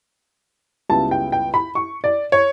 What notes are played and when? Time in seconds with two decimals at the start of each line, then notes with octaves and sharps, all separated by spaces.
0.89 C#2 C#3 G3 B3 E4 A5
1.11 G5
1.32 G5
1.54 B5
1.75 C#6
2.04 D5
2.32 C#5